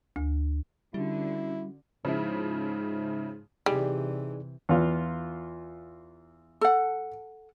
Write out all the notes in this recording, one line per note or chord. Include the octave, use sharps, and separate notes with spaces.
D2
D3 G3 C#4 E4 F#4
G#2 C#3 F3 E4
C3 E3 G3 D#4 G4 G#4 D5
E2 F4
A4 F#5